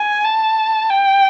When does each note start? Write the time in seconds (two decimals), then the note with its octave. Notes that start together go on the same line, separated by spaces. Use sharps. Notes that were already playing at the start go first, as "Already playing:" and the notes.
Already playing: G#5
0.24 A5
0.90 G5